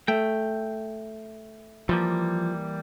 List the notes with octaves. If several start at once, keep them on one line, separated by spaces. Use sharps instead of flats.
A3 G5
E3 F3 G3 A#3